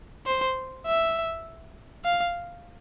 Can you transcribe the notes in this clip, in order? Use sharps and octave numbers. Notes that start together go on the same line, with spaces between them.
C5
E5
F5